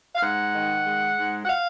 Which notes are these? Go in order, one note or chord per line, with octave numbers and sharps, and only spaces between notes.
F5
G#2 F#5
D#3
G#3
G#2
F#5
F5